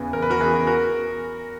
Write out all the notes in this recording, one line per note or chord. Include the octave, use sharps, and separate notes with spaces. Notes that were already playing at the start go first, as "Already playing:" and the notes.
Already playing: E2 C#3 E3 B3
E2 A#4
B4
F#4 A#4
C#3 E3 B3 G#4 B4
F#4 A#4